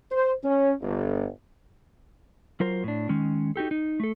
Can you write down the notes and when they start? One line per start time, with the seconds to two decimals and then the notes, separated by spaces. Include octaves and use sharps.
0.12 C5
0.44 C#4
0.81 G1
2.60 F#3 F4 A#4 C5
2.84 A2 D4
3.09 D#3 G#3 C#4
3.56 D#4 F#4 G4 A4
3.71 D#4
4.00 A3 A4